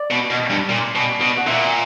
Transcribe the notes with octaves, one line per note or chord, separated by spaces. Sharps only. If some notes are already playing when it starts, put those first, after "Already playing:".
Already playing: D5
B2
B2
G2
A#2
B2
B2
F#5
A#2 E5